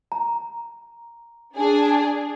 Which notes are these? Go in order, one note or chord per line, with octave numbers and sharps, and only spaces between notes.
A#5
D4 G#4